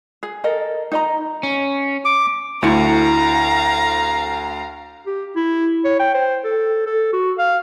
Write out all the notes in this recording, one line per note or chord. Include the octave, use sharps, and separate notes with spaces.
G#4
A4 A#4 D#5
D#4 D#5 A#5
C#4
D6
D2 A3 E4 F5 A#5 C6 C#7
G4
E4
C#5
G5
C5
A4
A4
F#4
F5